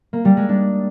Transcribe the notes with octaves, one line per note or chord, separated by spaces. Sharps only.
A#3
G3
G#3
D4